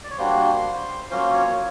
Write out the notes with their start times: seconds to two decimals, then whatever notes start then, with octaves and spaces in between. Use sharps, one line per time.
0.04 D5
0.10 C#5
0.18 G3 A#3 D4 F#4 C5
1.11 F#3 A#3 C#4 F4 C5
1.34 C#5